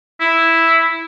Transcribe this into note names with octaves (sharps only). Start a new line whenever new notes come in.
E4